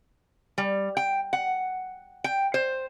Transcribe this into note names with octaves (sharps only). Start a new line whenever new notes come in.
G3
G5
F#5
G5
C5